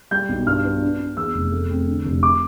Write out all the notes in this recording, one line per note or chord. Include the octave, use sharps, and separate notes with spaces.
G3 G6
B1
G2 F6
B3
D4
D4
E2 E6
F1
A3
C4
D3
F1
D6